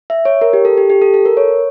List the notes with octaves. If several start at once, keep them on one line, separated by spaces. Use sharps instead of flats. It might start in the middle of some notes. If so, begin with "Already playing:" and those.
E5
C#5
A#4
G4
A4
G4
G4
A4
A4
A#4
C#5